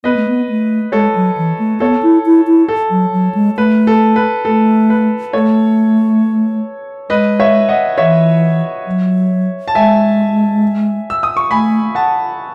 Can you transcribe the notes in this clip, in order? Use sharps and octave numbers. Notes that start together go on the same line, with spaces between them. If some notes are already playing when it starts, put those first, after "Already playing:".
B3 B4 D#5
A3
B3
A3
G#3 A4 C#5
F#3
E3
A3
B3 A4 C#5
E4
E4
E4
A4
F#3
F#3
G#3
A3 B4
A4
B4
A3 A4
B4
A3 A4 C#5
G#3 B4 D#5
C#5 E5
D#5 F#5
E3 C#5 E5
F#3
A5
G#3 E5 G#5
E6
D#6
C#6
A3 G#5 B5
F#5 A5